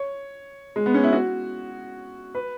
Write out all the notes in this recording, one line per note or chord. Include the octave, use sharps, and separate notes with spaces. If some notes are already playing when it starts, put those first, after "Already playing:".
Already playing: C#5
G#3
B3
C#4
E4
F#4
B4